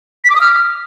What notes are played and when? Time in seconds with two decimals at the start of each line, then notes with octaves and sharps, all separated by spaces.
0.24 B6
0.30 D6
0.35 D#6
0.41 F6